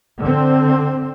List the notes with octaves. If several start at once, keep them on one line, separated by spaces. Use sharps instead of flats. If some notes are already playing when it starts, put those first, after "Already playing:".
D3 C4